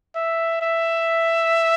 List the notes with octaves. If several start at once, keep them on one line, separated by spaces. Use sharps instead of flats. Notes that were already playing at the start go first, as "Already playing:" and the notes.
E5
E5